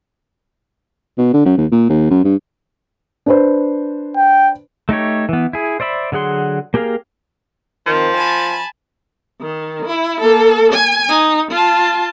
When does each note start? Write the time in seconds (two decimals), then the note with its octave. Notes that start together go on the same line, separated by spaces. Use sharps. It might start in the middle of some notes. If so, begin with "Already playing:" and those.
1.18 B2
1.33 D3
1.45 F#2
1.57 D#2
1.71 A#2
1.89 D#2
2.10 F#2
2.24 G2
3.26 D4 B4 C5
4.16 G5
4.89 A3 D#4 G4 C#5
5.29 E3 B3
5.53 E4 G#4
5.80 C5 D5 E5 B5
6.12 D3 F#3 G#4 F#5 C6
6.74 A#3 G4 G#4 A#4 F5
7.86 D#3 F3 C4
8.17 G#5 A5 B5
9.41 D#3
9.86 E4
10.21 A#3 A4
10.73 G#5
11.09 D#4
11.51 F4 A5